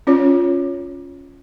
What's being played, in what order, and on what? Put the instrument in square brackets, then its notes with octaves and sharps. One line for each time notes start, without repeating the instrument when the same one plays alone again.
[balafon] C#4 F4 C#5